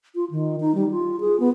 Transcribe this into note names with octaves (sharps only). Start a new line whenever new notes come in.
F4
D#3
D#4
G3
F4
G#4
B3